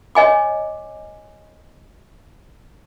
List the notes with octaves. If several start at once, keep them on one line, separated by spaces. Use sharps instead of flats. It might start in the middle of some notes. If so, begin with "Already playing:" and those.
C#5 D#5 G#5 D6